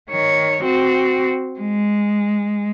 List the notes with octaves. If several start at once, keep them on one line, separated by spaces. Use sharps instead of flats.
D#3 C#5
C4 F#4
G#3